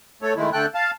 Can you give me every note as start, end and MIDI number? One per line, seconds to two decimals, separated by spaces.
0.22 0.34 57
0.22 0.34 69
0.22 0.34 73
0.37 0.50 51
0.37 0.50 56
0.37 0.50 57
0.37 0.50 64
0.53 0.66 50
0.53 0.66 57
0.53 0.66 69
0.53 0.66 79
0.53 0.66 90
0.75 0.91 77
0.75 0.91 81